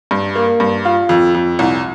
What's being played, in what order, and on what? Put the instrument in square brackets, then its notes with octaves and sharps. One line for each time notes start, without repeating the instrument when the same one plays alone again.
[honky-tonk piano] G2
A#3
G2
F4
F2
F2
C2